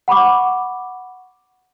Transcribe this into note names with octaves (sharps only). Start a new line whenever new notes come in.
F#5 B5 C#6 D6